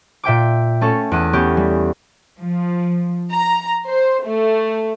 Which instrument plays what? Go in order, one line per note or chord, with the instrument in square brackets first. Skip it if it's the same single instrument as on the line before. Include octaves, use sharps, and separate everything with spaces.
[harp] A#2 E5 G5 D6
A3 C#4 A4
E2 F#6 D#7
A3 B3 C#4 G4
G3
[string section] F3
A#5
C5
A3